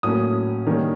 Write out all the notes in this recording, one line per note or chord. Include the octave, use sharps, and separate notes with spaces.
A2 F#3 A#3 C#4 D#6
D#3 G3 A#3 C#4